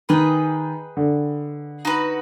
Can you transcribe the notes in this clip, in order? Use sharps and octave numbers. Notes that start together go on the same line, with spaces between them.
D#3 G#4 B4 D#5 G5
D3
D#4 F#4 B4